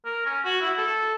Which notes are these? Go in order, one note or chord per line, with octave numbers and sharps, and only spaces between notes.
A#4
C#4
F#4
E4
A4